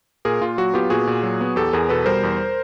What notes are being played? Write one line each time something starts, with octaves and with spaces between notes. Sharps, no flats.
A#2 G#4 A#4
A#2 F4
F#3 F#4
B3 F4 G4
A#2 F#4 G#4
A#2
F#3
B3
E2 G4 A4
E2 G#4 A#4
B2 A4 B4
G3 A#4 C5
E2